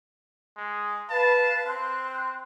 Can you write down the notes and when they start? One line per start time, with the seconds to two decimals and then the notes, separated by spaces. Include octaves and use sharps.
0.56 G#3
1.10 B4 F5 A5
1.67 C4 C6 F#6